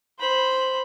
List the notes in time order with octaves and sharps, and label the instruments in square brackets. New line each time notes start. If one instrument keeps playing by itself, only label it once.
[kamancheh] C5 B5